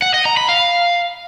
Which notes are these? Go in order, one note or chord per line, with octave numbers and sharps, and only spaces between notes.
F#5
D#5
A#5
B5
F5